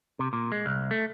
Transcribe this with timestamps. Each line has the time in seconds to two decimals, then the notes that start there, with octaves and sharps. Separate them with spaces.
0.19 C3
0.33 A#2
0.52 G#3
0.66 C2
0.91 A3